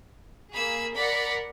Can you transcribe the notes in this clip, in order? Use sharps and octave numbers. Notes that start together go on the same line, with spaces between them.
A#3 G#4 B5 E6
A#4 D5 F#5 B5 B6